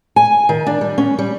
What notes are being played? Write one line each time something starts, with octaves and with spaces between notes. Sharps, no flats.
G#5
D#3
D4
G3
C#4
G3